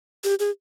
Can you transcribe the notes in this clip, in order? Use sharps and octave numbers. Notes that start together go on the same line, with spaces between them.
G4
G#4